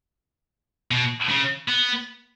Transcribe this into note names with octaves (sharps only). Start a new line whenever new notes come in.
B2
C#3
B3